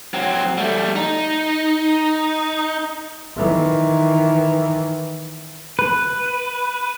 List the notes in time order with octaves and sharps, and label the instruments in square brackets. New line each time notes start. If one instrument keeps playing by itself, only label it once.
[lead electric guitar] F#3 C4
G3 A3
D#4
[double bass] D#3 E3
[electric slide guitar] B4